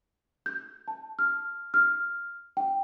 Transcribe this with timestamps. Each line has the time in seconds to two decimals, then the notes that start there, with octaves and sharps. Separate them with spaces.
0.46 G6
0.88 A5
1.19 F6
1.74 F6
2.57 G5